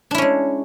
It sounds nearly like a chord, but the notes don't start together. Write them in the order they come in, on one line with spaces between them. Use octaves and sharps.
D4 E4 C#4 G#3